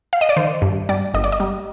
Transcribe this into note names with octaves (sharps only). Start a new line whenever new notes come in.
F5
D#5
D5
D#3 C5
G2
G3 D5
G1 D#5
D5
D#5
G3